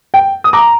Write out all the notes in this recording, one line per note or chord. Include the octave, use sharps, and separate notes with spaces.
G5
D#6
A#5 D6